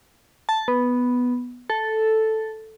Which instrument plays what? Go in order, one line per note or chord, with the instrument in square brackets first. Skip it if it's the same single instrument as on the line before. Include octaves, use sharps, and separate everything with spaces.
[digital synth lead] A5
B3
A4